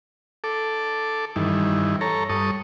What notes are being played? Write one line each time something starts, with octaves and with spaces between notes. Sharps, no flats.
A4 D6
G2 D#3 E3
A4 C#5 A#5
G2 A4 C#6 D#6